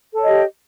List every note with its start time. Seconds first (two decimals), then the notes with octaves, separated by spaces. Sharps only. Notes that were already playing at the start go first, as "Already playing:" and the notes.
0.14 A4
0.18 C#5
0.23 D#5
0.27 G4